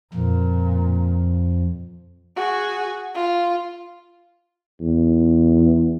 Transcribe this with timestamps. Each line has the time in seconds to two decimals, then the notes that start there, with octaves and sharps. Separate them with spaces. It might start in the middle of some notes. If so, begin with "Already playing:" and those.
0.14 F2 A#2
2.36 F#4 G#4
3.15 F4
4.81 E2